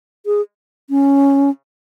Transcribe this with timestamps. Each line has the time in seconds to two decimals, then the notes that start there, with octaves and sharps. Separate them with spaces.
0.26 G#4
0.90 C#4